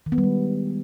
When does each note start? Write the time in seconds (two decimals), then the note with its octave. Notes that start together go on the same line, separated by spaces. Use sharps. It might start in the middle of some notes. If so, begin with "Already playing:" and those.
0.06 D#3
0.12 B3
0.18 G3
0.24 G#3